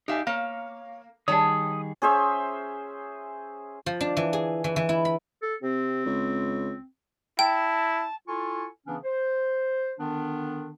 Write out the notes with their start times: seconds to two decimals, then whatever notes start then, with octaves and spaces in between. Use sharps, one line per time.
0.08 D#4 G4 E5 F5 G#5
0.27 A#3 C#5 F5
1.28 D#3 G3 G#4 C#5 A5 D#6
2.02 C#4 G#4 C5 E5
3.86 F3
4.01 D4
4.17 E3
4.33 G#4
4.64 E3
4.76 E3
4.89 E4
5.05 B5
5.42 A4
5.62 C3 C4
6.06 C#2
7.39 E4 G5 A5
8.28 E4 F4 A4 G#5 C#6
8.87 C#3 E3 B3 C#4 D4
9.03 C5
9.99 D3 D#3 B3 D4